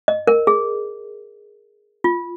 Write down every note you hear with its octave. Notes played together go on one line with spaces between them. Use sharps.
D#5
A#4
G#4
F4